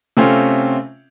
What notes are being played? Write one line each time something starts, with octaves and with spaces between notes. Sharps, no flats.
C3 A3 C4 C#4 F4